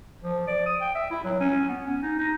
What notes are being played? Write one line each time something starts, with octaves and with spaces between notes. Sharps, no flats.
F3
D5
D#6
G5
E5
E4
F#3
C#4
B3
C#4
D#4
D#4